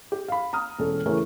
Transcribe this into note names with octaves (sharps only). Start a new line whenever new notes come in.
G4
F5 B5
A#5 D#6 F6
E1 C#4 A4
C#3 E3 A3 C#4 G#4 A#4